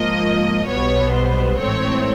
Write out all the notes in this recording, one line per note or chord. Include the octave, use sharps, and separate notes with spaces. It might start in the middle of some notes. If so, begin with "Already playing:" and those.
Already playing: G#2 F3 A#3 D#5
B1 B2 G3 B3 C#5
C5
A1 G#2 E3 A3 C4 C#5